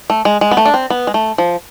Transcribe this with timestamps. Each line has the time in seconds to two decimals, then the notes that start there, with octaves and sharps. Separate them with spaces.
0.10 A3
0.25 G#3
0.41 G#3
0.51 B3
0.57 A3
0.65 D4
0.74 C4
0.90 B3
1.07 G#3
1.14 A3
1.38 F3